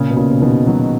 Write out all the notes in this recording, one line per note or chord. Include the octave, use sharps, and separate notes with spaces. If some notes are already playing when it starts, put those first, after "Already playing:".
Already playing: A#2 C#3
B2
A#2 C#3
C#3
B2 D#3
D#3 F#3